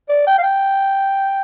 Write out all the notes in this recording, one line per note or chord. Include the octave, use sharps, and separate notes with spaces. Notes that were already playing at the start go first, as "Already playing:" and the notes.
D5
G5
F5
G5